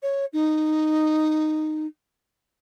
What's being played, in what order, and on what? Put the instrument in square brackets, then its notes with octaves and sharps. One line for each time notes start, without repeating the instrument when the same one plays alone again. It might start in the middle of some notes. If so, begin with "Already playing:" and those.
[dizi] C#5
D#4